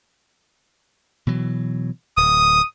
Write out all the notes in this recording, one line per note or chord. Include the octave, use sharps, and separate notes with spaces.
B2 E3 F#3
D1 D#6